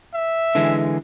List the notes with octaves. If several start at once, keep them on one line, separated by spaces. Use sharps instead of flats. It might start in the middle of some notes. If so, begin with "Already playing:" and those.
E5
D3 E3 G#3